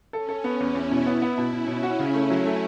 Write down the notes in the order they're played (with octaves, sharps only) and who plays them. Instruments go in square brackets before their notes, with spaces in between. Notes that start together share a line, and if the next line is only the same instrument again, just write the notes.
[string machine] C#4 [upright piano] A4
[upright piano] A4
B3
[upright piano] E2 [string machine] E4
[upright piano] E2
B2
[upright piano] B3 [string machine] E4
[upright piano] B3
B2
[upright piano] B2 [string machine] C#4
[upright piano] B2
F#4
C#3
A3
F#3
A3